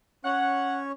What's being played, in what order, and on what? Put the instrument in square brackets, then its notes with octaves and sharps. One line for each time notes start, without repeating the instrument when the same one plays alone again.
[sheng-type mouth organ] C#4 C#5 [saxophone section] F#5